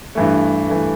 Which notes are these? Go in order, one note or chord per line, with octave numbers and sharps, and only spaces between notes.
G2 E3 A3
E3 A3